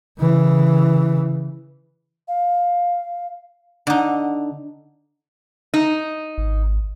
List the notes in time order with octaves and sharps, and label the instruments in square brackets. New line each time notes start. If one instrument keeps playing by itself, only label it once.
[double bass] C#3 E3
[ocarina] F5
[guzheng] D3 D#4 [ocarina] F#5
[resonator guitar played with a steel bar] D#4
[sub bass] G#1